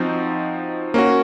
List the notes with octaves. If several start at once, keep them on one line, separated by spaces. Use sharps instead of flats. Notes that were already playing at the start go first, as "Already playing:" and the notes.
Already playing: F3 C4 D#4 F#4
A#3 C#4 F#4